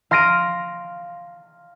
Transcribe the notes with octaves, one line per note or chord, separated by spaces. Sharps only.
F5 C6 F6 A#6 D7 D#7